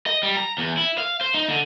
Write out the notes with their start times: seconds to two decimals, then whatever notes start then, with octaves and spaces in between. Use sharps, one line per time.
0.06 D#5
0.23 G3
0.37 A#5
0.58 E2
0.77 E4
0.98 F5
1.21 C5
1.34 D#4
1.50 D3